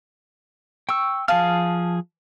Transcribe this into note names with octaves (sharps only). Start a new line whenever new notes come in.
G5 C#6 E6
F3 G#4 F5 A5 D#6 F6